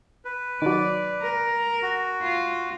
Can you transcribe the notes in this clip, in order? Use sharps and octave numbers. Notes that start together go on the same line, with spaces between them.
B4
D#3 F#3 D5
A#4
F#4
F4